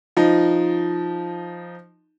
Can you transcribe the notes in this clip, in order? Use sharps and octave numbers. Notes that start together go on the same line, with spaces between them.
F3 D#4